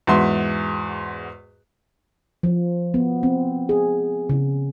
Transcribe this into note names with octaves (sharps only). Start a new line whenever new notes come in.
E2 G#2 F#4 E5 C6
F3
B3
C4
G#4
C#3